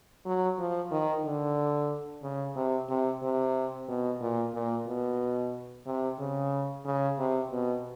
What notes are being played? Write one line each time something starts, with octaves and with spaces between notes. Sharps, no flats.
F#3
F3
D#3
D3
C#3
C3
C3
C3
B2
A#2
A#2
B2
C3
C#3
C#3
C3
B2